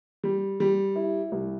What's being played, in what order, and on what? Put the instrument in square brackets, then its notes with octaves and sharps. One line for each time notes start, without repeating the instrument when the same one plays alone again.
[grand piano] G3
G3
E4
C2